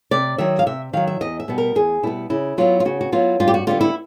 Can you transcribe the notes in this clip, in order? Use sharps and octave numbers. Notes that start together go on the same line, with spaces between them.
C3 D5
D#3 F#3 E5
F5
C3 E5
D#3 F#3 F5
E5
E2 D#5
E5
B2 G3 B3
A#4
E2 G#4
B2 G3 B3 E4
C#3 E4
F#3 B3 E4 F4
F4
C#3 F#4
F#4
F#3 B3 E4 F4
G2 F4
G4
F#4
D3 G3 B3 F4
E4